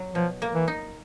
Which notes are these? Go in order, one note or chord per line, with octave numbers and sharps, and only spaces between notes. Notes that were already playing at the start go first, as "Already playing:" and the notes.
Already playing: F#3
B2 F3
A#3
E3
D#4